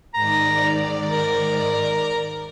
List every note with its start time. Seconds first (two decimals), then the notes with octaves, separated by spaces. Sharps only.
0.14 G#2 D#3 D5 A#5
1.13 A#4